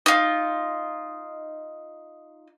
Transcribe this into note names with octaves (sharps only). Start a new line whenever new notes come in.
D#4 F4